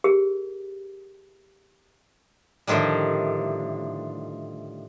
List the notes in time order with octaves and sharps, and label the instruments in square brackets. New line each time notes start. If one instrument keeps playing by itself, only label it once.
[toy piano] G4 G#4 A#4
[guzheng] A2 D3 D#3 F3 G3